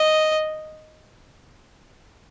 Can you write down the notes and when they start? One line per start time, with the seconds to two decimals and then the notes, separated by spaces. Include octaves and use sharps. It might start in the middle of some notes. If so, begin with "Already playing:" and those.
Already playing: D#5